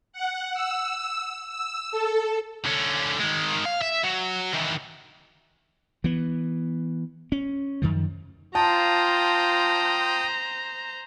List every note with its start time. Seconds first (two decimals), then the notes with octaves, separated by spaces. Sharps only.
0.13 F#5
0.54 E6
1.49 E6
1.91 A4
2.66 D3 C#4
3.20 D#3 G#3
3.65 F5
3.82 E5
4.04 F#3
4.53 D#3 E3
6.04 E3 B3
7.32 C#4
7.82 F#2 D#3 F3
8.55 F4 C5 G5 A5 A#5 D#6